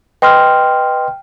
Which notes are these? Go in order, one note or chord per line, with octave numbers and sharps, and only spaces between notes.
B4 D#5 G5 C6 F6